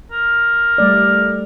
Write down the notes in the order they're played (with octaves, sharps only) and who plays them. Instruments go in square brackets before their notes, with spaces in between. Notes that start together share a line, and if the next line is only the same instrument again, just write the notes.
[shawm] A#4
[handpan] G3 A3 D5